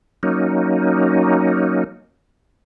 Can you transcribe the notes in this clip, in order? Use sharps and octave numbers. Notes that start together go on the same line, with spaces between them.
F#3 A#3 C#4 D#4